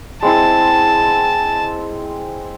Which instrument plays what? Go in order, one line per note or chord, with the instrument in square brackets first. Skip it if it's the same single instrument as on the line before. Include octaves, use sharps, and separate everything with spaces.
[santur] G#3 C4 E4 [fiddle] A5